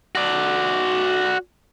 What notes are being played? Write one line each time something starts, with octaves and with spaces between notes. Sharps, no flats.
F#4 D5